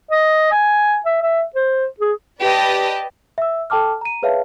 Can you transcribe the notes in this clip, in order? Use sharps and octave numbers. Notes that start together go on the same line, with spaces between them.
D#5
G#5
E5
E5
C5
G#4
G4 B4 D5 D#5 A5
E5 E6
A4 G5 A5 D6 F6
A#5 D#7
G#4 B4 C#5 E5 F5 A5